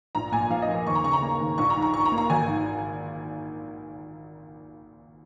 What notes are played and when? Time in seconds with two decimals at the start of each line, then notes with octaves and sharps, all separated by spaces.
0.15 A#1 A#5
0.32 A#2 G#5
0.50 F3 F5
0.62 D#5
0.69 A#3
0.86 D#2 C#6
0.95 A#5
1.04 C#3 C#6
1.13 A#5
1.22 A#3
1.40 D#2
1.58 A#1 C#6
1.70 A#5
1.76 G#2
1.82 A#5
1.94 D#3 C#6
2.06 A#5
2.12 A#3
2.18 A#5
2.30 G#1 G#5
2.48 G#2